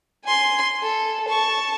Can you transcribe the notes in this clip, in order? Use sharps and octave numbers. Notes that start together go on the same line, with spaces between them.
G#5 C6
A4
A5 C#6